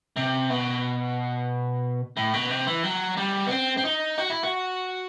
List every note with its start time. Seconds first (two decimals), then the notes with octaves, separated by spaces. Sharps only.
0.16 C3
0.50 B2
2.17 A2
2.34 B2
2.50 C3
2.67 E3
2.83 F#3
3.17 G3
3.47 B3
3.51 C4
3.77 C4
3.85 D#4
4.18 F#4
4.30 E4
4.43 F#4